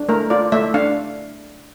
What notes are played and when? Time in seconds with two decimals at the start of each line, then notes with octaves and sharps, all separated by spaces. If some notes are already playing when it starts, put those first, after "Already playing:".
Already playing: D4
0.09 A3 A#4
0.30 F4 D5
0.52 A3 E5
0.74 D4 F5